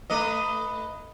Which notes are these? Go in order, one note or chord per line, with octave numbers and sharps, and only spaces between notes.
A3 B4 D#5